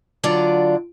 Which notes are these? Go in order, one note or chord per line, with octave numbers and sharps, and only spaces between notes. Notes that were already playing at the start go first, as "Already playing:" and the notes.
D3 F#3 D4 F4 D5